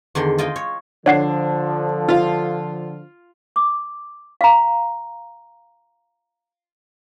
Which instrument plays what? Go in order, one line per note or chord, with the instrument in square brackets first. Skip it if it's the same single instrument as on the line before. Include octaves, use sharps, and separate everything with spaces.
[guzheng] E2 D3 D#3 C6
F4 D#5 G5 G#5
C#5
[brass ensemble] D3 F3 [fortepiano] D4 [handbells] C#5 F#5 C7
[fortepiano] F4 F5
[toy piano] D6
F5 A#5